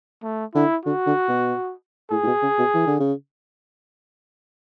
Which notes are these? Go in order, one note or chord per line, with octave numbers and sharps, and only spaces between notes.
A3
D3 E4
D3 F#4
D3
B2
A2 G#4
A2
B2
C#3
B2
E3
D3
C#3